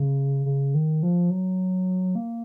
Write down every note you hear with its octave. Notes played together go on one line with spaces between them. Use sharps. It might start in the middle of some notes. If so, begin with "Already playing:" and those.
Already playing: C#3
C#3
D#3
F3
F#3
A#3